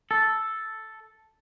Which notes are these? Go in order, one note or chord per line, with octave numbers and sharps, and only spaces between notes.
A4